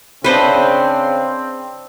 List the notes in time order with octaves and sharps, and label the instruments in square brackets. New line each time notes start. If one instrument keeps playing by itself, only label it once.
[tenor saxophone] C#3 [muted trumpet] C4 [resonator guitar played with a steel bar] D4 E4 [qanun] B4 C5 D#5